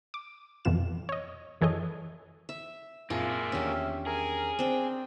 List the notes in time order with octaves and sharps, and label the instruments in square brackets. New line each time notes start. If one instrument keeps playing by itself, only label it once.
[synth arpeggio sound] D6
F2 B2 E3 F4 E7
C#5 D#5
F#2 E3 G#4 A4 C#5 D#5
[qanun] E5
[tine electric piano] F#2 A#2 C4 [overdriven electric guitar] A#3 G#4 [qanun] F4 [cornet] E5
[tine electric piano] E2 D#3 D4 [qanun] C#4 G4
[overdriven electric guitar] G#4 [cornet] A#4
[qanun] C4 G5 [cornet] D4